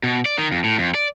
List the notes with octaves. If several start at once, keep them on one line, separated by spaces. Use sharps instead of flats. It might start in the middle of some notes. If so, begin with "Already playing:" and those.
B2
D5
D#3
F2
A2
F2
D5